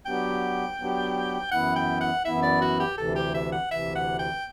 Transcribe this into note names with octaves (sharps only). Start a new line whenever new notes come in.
F#3 B3 D4 G4 G5
F#3 B3 D4 G4
F#2 E3 B3 E4 F#5
G5
F#5
F#2 E3 B3 E4 E5
D5
F#4
G4
D2 C3 E3 A4
G4
E5
F#5
D2 C3 E3 E5
F#5
G5